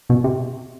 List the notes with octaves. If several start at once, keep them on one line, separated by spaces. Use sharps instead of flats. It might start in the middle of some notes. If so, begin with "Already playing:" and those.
B2
C3